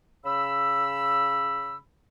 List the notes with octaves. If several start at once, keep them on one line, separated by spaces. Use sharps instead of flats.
C#3 B5 E6